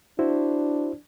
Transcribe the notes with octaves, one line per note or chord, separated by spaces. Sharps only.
D4 E4 F#4 C5